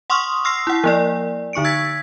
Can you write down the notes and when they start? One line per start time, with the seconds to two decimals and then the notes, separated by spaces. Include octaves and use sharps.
0.10 F#5 C6 C#6 D#6 F6
0.45 C6 E6 F6 A#6 C7
0.67 E4 F#5
0.84 F3 A#3 D5
1.53 D3 D#4 C#6 C#7 D7
1.64 E6 G#6 A6 B6